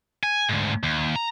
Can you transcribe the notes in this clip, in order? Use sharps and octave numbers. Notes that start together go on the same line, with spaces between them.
G#5
D2 G#2
D#2
A#5